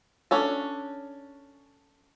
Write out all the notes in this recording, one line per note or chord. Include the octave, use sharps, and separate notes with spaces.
C#4 D4 A4